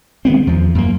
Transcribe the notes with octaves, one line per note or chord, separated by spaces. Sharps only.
D#3 G#3 B3 C4
E2 F3
F#2 A#3